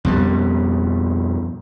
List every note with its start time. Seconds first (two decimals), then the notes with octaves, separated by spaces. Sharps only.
0.05 F2 B2 G3